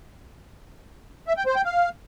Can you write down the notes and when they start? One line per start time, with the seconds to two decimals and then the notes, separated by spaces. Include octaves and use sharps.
1.27 E5
1.37 G5
1.46 C5
1.56 G5
1.65 F5